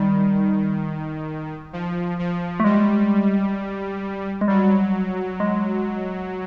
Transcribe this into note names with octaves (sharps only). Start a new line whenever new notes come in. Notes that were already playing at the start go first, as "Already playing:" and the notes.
Already playing: D#3 G3
F3
F3
A3
G3 G#3
G#3
F#3 G3
G#3